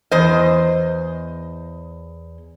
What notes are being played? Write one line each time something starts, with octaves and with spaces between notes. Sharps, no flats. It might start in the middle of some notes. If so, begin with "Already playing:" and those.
E2 C5 D#5